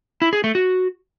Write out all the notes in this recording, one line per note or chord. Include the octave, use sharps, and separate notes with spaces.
E4
G#4
A3
F#4